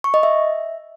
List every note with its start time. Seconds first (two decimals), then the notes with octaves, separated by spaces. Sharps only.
0.04 C#6
0.14 D#5
0.23 E5